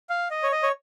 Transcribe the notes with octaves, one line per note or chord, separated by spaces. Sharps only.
F5
D#5
C#5
D#5
C#5